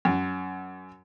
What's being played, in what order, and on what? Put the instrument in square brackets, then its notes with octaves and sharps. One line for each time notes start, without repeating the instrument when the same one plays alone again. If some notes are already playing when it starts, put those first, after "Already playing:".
[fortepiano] F#2